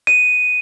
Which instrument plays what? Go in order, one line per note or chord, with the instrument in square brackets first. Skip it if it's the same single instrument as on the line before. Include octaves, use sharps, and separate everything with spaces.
[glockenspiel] D#7